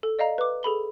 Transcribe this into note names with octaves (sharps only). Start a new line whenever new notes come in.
A4
D5 D#5 F5 A#5
B4 D6
G#4 A4 B5 G7